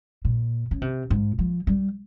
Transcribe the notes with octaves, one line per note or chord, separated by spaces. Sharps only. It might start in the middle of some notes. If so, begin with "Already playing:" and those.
A#2
C#3
C3
G#2
F3
G3